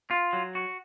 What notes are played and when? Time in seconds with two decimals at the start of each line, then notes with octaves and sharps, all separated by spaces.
0.11 F4
0.33 F#3
0.55 F#4